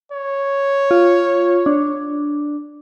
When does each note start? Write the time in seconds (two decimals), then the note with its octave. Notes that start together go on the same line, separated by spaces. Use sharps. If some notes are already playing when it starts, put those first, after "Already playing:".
0.12 C#5
0.91 F4
1.66 D4